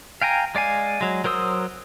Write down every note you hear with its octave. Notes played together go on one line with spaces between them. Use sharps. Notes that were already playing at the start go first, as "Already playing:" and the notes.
F5 G5 G#5 A#5
G#3 D5 F5 G#5
F#3 G#3
F#3 A#4 C5 D#6 E6